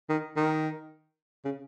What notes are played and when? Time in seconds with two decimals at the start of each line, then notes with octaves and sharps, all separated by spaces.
0.09 D#3
0.36 D#3
1.45 C#3